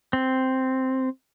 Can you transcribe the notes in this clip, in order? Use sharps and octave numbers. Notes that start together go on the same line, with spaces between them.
C4